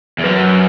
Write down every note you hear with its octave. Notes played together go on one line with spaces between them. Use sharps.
E2
F#2 B4